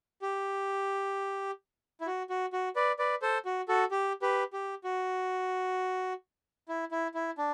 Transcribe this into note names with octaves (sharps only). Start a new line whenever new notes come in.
G4
E4
F#4
F#4
F#4
B4 D5
B4 D5
A4 C5
F#4
F#4 A4
G4
G4 B4
G4
F#4
E4
E4
E4
D4